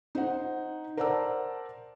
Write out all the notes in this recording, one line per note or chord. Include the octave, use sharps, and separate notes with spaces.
D#4 C5 F#5
A#4 C5 D5 F#5 A5 E6